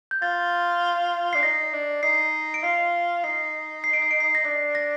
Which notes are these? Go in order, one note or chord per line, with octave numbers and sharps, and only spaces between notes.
G6
F4 A6
D4 C7
D#4 A#6
D4
D#4 C7
D7
F4 C7
D#4 C7
C7
D7
C7
D7
C7
A#6
D4 C7
A#6